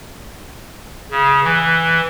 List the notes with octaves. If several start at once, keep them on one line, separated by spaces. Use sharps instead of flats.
C#3
E3